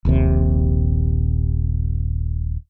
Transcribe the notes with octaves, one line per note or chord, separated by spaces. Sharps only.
D#1 A#1 D#2 C3